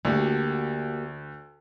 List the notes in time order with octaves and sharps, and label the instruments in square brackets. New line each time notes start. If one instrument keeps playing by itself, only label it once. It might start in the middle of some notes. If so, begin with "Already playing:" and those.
[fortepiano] D2 [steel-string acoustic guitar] A#3 F#4 G4